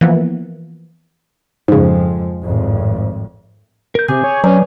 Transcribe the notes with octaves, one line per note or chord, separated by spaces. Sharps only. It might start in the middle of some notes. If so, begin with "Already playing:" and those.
E3 F3 A#3 B3
F2 G#2 C#3 F3 G#3
G#1 F2 A2
A#4 G6
C3 G#4 G#5 D6 G6
C#5
F#3 C#4 B4 C#5 D5